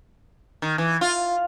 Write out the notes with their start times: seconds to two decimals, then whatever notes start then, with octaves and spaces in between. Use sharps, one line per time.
0.62 D#3
0.78 E3
1.01 F4